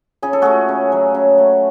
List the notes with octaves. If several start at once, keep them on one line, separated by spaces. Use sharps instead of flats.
C#3 G#4
A4
A3 F#4 G#4
C#3
F#3
C#3
A3